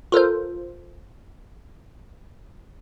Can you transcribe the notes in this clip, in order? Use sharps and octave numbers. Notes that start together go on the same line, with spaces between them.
F4 A4 A#4 C5